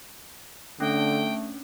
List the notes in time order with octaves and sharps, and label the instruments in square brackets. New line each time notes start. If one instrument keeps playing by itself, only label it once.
[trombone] D3 [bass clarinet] A3 [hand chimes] C#4 D4 [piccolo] G5